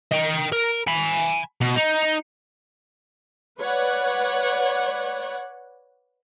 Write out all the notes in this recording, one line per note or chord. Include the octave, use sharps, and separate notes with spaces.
D#5 G5
A#4
G#5 B5
B2
D#4
B4 C#5 D5 F#5